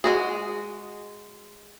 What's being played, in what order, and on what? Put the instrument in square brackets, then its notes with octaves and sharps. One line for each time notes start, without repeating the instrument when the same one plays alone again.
[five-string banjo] G#3 F#4 G#4